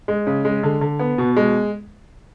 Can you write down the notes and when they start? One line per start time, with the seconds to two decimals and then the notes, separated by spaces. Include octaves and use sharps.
0.08 G#3
0.27 C#3
0.45 G#3
0.63 D3
0.81 D3
0.99 B3
1.18 B2
1.36 G#3